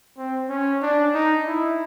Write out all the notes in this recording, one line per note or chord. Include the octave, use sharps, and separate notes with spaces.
C4
C#4
D4
D#4
E4